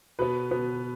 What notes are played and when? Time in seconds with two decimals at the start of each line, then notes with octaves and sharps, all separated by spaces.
0.19 B2 B3 B4
0.51 B2 B3